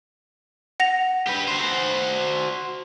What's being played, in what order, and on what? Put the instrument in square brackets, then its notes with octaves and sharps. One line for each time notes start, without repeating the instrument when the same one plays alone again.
[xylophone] F#5 A#6 F7
[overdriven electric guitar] G4 B4
F#4 C5